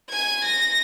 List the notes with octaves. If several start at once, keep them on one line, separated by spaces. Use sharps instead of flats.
G#5 G#6
A#6